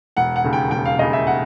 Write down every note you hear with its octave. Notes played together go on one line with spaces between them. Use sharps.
E1 F#5
F#5
D#2 C#3
G5
E1 G5
F5
D#2 C#3 D#5
E5
F#5